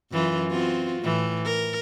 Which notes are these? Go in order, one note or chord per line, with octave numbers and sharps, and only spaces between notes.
F#2 E3 F4
C4 F4 F#4
A2 E3
A#4